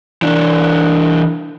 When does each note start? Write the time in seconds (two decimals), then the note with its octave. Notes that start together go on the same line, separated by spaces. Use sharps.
0.22 E3 D4